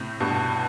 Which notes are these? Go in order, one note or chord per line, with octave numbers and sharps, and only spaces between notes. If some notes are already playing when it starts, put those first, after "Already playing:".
Already playing: A2 C3
G2 B2